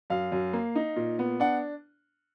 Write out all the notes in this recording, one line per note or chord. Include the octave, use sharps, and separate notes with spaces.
F#2 F5
F#2
A#3
D#4
A#2
B3
D4 F#5